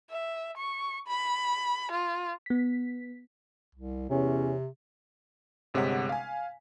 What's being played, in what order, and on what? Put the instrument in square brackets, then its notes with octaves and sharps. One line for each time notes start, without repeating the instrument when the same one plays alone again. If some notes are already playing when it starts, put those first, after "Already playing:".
[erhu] E5
C#6
B5
F4
[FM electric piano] B3 B6
[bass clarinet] C2
[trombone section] E2 C#4 [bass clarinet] C3
[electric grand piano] G1 C3 G#3 C#5 F#5 B6
F5 G#5